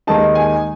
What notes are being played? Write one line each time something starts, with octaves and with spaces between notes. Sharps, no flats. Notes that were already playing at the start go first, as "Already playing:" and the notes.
D#2 D#3 G#3 D#4 A5
G#5